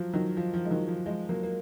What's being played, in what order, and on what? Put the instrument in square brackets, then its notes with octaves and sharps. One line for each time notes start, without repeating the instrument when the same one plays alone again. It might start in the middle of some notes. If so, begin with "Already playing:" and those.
Already playing: [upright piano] F3 F#3
D#3 F#3
F3
F3
G#3
D#3 F#3
F3
F3 G#3
F#3 A#3
A#3